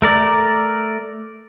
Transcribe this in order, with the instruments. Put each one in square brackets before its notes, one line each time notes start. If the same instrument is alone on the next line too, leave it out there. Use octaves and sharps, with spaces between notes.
[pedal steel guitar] A3 A#4 D5